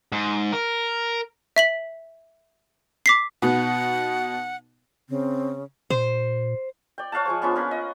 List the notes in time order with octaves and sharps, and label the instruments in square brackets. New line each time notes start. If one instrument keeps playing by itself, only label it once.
[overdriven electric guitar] G#2
A#4
[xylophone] E5 B6 F#7
D6 B6 C7
[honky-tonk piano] B2 B3 D#4 [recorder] F#5
[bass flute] C#3 [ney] C4
[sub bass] A#2 [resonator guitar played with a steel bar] C5
[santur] D5 G5
C#5 F5 F#5 A5
F3 G#3 C5
B3 C#4 D4 F4
A#3 C#4 B4
D#5